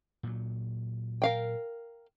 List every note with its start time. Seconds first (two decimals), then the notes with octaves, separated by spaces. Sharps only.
0.23 A#2 F#3
1.22 A#4 F5 G5